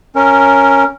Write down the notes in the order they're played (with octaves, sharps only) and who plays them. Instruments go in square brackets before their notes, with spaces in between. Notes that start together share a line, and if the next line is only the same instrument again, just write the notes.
[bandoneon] C#4 A#4